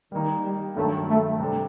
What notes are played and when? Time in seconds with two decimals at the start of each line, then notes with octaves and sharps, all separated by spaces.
0.12 D#3 G3 A#3 D#4
0.44 G3
0.76 G2 D#3 F#3 A3
1.08 A3
1.40 C3 G3 D4 A4 C5